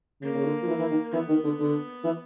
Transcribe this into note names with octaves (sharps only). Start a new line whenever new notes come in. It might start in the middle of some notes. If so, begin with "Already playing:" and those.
C#3 A#3
C#3
D3
F3
E3
E3
D#3
E3 B3
D#3
D3
D3
E3